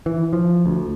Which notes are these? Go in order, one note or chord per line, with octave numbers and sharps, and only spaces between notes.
E3
F3
D2